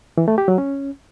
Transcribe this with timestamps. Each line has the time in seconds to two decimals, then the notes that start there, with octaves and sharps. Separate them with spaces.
0.18 E3
0.28 A3
0.38 G4
0.48 F#3
0.58 C#4